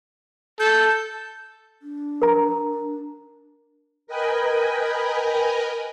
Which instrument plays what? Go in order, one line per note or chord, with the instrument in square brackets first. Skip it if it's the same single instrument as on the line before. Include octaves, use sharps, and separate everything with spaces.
[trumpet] A4 [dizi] G6
[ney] D4
[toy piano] A#4 A#5
[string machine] A#4 B4 D#5 G5 G#5 B5